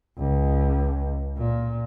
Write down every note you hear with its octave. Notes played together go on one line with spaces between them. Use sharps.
C#2
A#2